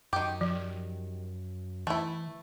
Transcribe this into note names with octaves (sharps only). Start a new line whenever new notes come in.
F#2 D#3 G4
F3
E3 A3 E4